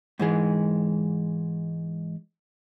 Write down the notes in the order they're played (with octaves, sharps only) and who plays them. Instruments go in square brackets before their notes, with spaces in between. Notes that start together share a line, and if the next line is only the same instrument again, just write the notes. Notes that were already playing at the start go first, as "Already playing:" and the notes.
[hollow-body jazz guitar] G#2 E3 G#3